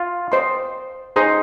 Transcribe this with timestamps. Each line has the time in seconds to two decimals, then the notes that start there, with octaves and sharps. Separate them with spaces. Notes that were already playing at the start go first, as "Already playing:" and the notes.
Already playing: F4
0.32 C5 D#5 C6
1.16 D#4 G#4 C5 G#5 C6